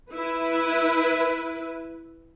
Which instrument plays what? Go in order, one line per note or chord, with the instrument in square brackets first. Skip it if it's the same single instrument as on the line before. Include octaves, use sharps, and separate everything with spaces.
[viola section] E4 B4